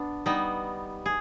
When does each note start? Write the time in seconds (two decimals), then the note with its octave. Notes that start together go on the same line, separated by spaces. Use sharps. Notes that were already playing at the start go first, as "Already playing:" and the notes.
Already playing: B3 D4
0.26 G3 B3 D#4
1.06 G#4